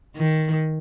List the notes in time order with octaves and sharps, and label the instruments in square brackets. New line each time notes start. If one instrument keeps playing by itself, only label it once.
[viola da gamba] D#3